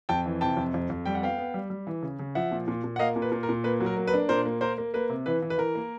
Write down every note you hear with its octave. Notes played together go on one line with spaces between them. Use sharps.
F2 G5 A5
E3
C3 G5 A5
F2
F2
F2
G3 G5
F#5
B3 F5 G5
B3
G3
G3
E3
C#3
C#3
F3 E5 F#5
A#2
A#2
A#2
F#5
A#3 D#5 F5
A#2
B4
A#2
A#4
A#2
A#3 B4
F#3
A#4
A#3
B4
D4
A#2 A#4 C5
A#3
A#3 A#4 C5
A#3
A#3 B4
C3
E3 B4
E3
B4
E3 A#4
A#3